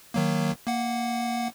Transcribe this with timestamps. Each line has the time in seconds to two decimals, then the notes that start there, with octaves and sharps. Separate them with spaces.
0.14 D#3 F#3 A#3
0.67 A#3 F#5